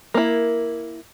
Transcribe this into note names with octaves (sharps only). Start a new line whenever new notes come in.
A#3 E4